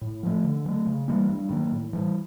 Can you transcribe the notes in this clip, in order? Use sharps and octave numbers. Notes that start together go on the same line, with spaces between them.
A2
F3 A3
D3
F#3 A3
C#3
E3 G3 A#3
G2
D#3 F#3 A#3
A2
E3 G3